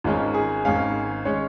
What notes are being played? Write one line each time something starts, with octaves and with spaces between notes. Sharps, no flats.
G#1 G#2 G#3 C#4 F4
G#4
G#1 G#2 G#3 C#4 F5
G#3 C#4 C#5